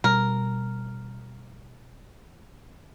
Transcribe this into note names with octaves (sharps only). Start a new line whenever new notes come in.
B2 G3 A#4